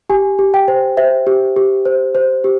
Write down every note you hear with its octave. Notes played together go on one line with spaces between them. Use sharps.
G4 G#5
G4
G5
C5
C5 E5
G4
G4
C5
C5
G4